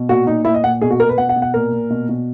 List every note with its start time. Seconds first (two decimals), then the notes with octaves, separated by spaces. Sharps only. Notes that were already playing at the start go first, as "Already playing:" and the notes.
Already playing: B2
0.09 A#2 F#4
0.26 A#2 D#4
0.45 A#2 E4
0.54 D#5
0.64 A#2 F#5
0.81 B2 G#4
0.91 F#4
0.99 B2 A#4
1.09 B4
1.17 B2 F#5
1.29 F#5
1.36 B2
1.42 F#5
1.54 A#2 A#4
1.72 A#2
1.90 B2
2.09 B2